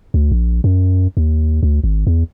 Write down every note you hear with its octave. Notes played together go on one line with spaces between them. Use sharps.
D2
A#1
F#2
D#2
D2
G#1
E2